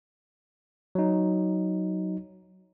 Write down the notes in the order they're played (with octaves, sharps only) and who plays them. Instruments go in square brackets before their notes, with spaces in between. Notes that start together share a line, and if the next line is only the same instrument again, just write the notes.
[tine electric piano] F#3 D#4